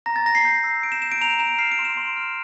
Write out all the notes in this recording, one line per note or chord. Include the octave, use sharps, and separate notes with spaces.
A#5 A#6
A6
A#5 A#6
C7
G6
E6
G6 D7
E7
G6 E7
D7
A#5 F7
A#5 E7
F6 C7
D7
C6
E7
C6
F6